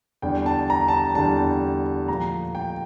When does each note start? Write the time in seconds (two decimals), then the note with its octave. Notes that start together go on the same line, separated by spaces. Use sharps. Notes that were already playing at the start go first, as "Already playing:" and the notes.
0.22 E2 D3 G3 G5
0.46 A5
0.70 A#5
0.88 A5
0.93 A#5
1.15 E2 D3 G3 A5
2.08 A#2 F3 A3 A#5
2.55 G5